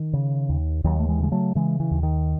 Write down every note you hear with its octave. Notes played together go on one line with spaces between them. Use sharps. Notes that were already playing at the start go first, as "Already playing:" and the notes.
Already playing: D#3
C#3
D#2
D#2 D#3 F#3
A3
E3 G#3
C#3 G#3
F#3 A3
C#3 E3 G#3
E3
D#2
D#3